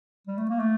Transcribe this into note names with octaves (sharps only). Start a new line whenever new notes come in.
G3
A3
A#3
A3